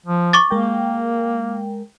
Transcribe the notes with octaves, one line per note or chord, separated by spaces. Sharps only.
F3
C#6 D6 A6
G#3 A#3 A#4 G5